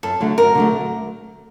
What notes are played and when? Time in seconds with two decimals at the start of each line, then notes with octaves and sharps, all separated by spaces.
0.03 F#2 A4
0.20 D3 F#3 A3
0.38 F#2 A#4
0.55 D3 F#3 A3